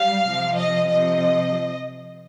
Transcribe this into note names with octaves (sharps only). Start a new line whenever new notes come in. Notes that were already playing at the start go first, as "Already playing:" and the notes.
Already playing: G3 F5
C3 F3
D#5
C3 F3 D#5